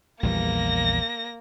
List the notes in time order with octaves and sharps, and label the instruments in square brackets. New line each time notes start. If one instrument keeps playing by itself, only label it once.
[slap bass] A#1 E2 G3 [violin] A#3 A#6